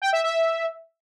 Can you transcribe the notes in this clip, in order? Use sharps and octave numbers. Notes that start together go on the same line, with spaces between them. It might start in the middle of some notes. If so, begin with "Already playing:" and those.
G5
E5
E5